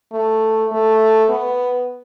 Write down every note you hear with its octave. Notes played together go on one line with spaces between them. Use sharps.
A3
A3
B3